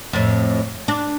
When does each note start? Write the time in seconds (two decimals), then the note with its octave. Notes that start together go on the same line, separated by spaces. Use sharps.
0.13 F2 A2
0.88 D4